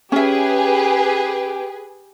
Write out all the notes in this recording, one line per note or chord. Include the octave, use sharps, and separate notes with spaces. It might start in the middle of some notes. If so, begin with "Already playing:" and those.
C#4 G4 G#4 B4 E5